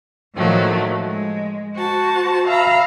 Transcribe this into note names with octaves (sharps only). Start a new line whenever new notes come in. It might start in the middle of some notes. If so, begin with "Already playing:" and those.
A2 D#3 F3 F#3 A3 A#3
G#3
F#4 C5 A5
E5 F5 A#5 B5